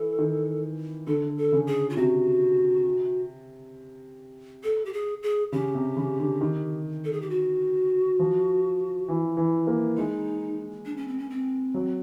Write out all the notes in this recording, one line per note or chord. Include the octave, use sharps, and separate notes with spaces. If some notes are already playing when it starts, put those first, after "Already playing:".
Already playing: E3 A4
D#3
D3 A4
A4
C#3
G#4
F4
C3 F#4
A4
G4
G#4
G#4
C#3 G4
C3
C#3
D3
D#3
A4
G#4
G4
F#4
F3
E3
E3
A#3
G#3 D#4
D4
C#4
C4
C#4
C4
F#3